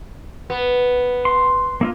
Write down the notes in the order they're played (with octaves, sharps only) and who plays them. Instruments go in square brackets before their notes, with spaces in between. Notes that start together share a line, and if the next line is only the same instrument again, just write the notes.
[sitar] B3
[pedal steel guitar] C6
A#3 E4 F4